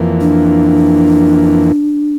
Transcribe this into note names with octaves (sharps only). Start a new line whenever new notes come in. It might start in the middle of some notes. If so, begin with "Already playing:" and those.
Already playing: F2 E3 A#3
D4